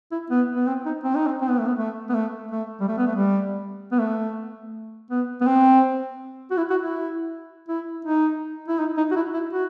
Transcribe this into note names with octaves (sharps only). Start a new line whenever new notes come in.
E4
B3
B3
C4
D#4
C4
D#4
C4
C4
B3
A3
B3
A3
B3
A3
A3
G3
A3
B3
A3
G3
B3
A3
B3
B3
C4
F#4
E4
F#4
E4
E4
D#4
E4
D#4
D#4
F#4
E4
E4
F#4